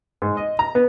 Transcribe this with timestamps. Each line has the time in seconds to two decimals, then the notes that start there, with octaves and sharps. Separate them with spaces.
0.22 G#2
0.37 D#5
0.59 A#5
0.75 B3